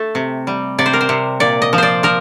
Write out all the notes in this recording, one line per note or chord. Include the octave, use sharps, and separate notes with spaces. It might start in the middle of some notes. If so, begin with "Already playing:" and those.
Already playing: A3 A4
C3
G3
C3 D5
C5
A#4
C5
C3
A#2 D5
D#5
F3
C5 D5
F3 A#4